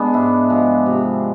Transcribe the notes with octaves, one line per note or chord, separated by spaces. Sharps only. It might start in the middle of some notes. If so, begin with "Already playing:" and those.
Already playing: G#3 B3 D4
G#2 E4
F3 G#3
C3